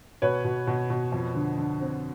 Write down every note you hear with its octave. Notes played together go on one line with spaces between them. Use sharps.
B2 B4 C#5
B2
B2
B2
F2
D3
D3
C4